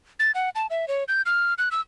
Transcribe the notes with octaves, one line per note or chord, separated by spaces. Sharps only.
A6
F#5
A5
E5
C#5
G6
F6
F#6
E6